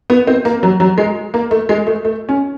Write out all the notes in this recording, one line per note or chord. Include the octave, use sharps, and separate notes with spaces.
B3
C4
A#3
F#3
F#3
G#3
A#3
A3
G#3
A3
A3
C#4